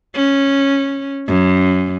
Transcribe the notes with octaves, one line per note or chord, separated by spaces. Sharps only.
C#4
F#2